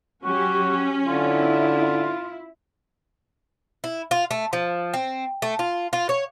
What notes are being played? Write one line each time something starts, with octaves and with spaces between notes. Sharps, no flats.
F#3 C#4 F#4 G4
D3 E4 F4
E4
F4
A3
F3
C4
A3
F4
F4
C#5